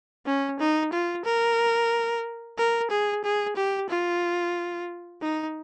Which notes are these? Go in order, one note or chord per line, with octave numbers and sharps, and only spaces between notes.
C#4
D#4
F4
A#4
A#4
G#4
G#4
G4
F4
D#4